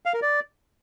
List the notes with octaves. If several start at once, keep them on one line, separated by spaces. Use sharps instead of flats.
F5
A#4
D5